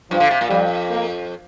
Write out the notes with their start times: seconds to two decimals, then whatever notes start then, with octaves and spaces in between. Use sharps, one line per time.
0.11 G2 F3
0.20 D3
0.31 C3
0.41 A#2
0.50 F2 G3
0.91 A#3